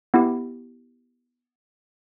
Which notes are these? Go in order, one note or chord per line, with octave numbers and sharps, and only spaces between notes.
B3 E4 G4